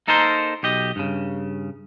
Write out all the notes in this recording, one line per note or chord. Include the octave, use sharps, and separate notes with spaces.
A#3 D#4 A4 A#4 C5
B1 G4 D#5
G2 C#3